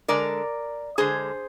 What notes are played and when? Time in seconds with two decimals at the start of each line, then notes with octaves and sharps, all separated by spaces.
0.08 D3 G#3 A#4 D5
0.98 D3 G#3 G#4 C5